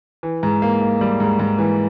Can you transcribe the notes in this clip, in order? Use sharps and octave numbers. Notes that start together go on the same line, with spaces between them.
E3
G#2
A#3
A#3
G3
G#2
G#2
E3